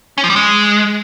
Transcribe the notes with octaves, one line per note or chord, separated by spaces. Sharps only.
C#4
F3
G3
G#3